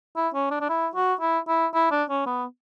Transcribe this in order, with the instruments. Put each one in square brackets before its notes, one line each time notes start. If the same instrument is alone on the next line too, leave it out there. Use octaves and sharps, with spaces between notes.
[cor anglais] E4
C#4
D4
D4
E4
F#4
E4
E4
E4
D4
C#4
B3